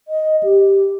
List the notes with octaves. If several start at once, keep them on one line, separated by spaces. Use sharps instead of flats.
D#5
G4